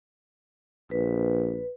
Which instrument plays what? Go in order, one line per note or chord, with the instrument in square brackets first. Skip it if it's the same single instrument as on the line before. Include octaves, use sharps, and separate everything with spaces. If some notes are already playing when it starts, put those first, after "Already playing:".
[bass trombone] A#1 [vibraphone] B4